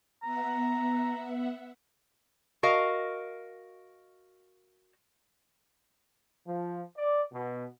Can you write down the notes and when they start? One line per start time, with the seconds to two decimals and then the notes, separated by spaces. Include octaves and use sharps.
0.23 B3 E5 F#5 A#5
2.63 F#4 A#4 D#5 F5
6.47 F3
6.97 D5
7.33 B2